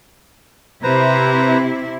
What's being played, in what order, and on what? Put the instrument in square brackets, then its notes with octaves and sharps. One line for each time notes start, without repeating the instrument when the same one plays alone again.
[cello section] C3 E4 [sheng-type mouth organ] B4 C5 A#5